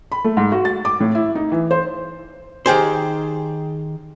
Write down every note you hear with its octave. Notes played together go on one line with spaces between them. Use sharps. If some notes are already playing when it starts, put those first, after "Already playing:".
B5
A3
G#2
F#4
A6
D6
A2
E4
D#4
E3
C5
D#3 G4 G#4 C5